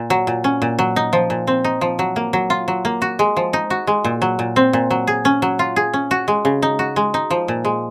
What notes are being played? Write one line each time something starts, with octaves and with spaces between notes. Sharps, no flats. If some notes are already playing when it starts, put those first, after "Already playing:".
Already playing: A#2
F#3
A#2
C#4
A#2
F#3
D#4
F3
A#2
C4
D#4
F3
F#3
A#3
F#3
F4
F#3
A#3
F#4
G#3
F3
D#4
F#4
G#3
A#2
F#3
A#2
C4
A#2
F#3
G#4
C#4
F#3
F4
G#4
C#4
F#4
G#3
C#3
D#4
F#4
G#3
D#4
F3
A#2
G#3